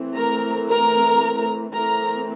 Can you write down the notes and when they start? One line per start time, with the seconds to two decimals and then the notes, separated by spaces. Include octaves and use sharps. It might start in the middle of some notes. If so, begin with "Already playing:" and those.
Already playing: E3 A3 C4
0.16 A#4 A#5
0.68 A#4 A#5
1.73 E3 A3 C4 A#4 A#5